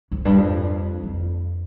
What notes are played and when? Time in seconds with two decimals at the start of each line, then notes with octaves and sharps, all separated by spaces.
0.11 F2
0.25 G2
0.38 F2
1.03 F2